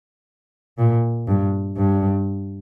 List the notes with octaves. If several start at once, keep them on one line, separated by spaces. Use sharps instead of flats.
A#2
G2
G2